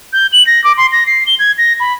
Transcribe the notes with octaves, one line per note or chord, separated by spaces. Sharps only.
G6
F#7
A#6
D6
C6
A#6
C7
G7
G#6
A#6
B5